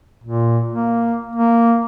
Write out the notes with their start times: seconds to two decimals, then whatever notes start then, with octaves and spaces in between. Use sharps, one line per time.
0.24 A#2
0.72 A#3
1.36 A#3